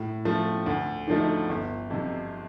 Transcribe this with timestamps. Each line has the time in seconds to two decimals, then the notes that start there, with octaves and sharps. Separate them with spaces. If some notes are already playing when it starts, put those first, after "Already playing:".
Already playing: A2
0.25 F3 A3
0.66 D2
1.08 D3 F3 A3 D#4
1.49 G1
1.90 F2 C3